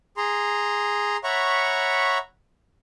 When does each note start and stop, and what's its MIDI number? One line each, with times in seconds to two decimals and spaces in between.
0.17 1.17 68
0.17 1.17 82
0.17 1.17 84
1.24 2.18 73
1.24 2.18 76
1.24 2.18 78
1.24 2.18 82
1.24 2.18 83
1.24 2.18 85